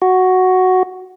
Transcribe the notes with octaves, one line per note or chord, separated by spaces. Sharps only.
F#4